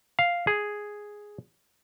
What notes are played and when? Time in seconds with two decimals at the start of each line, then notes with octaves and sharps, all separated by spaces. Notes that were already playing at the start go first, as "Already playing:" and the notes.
0.19 F5
0.47 G#4